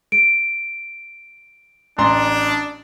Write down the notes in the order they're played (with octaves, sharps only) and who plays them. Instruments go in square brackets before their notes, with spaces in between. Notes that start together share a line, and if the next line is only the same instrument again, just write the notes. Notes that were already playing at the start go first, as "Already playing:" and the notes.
[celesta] D7
[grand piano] A1 A#5 C6 [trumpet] D4